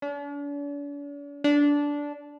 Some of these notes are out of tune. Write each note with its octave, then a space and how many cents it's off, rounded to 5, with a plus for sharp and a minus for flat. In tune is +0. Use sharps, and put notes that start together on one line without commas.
D4 -45
D4 -15